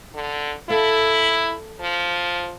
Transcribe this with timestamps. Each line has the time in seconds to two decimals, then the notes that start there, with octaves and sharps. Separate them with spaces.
0.14 D3
0.69 E4 A4 F5
1.80 F3